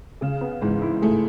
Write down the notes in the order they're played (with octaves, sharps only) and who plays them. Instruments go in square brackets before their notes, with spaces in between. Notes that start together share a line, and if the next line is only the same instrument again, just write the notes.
[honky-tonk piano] C#3 [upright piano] G#4
[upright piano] B3
[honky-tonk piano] G#2 G#3 [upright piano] E3
[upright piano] E4
[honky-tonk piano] A2 A3 [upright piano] G#4